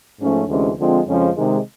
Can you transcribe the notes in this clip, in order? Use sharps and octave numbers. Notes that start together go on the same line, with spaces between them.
G#2 F3 A3 C#4
D2 C3 E3 G#3 C#4
D3 F3 G#3 C4 F4
F2 C#3 F3 G#3 C#4
C3 D#3 G#3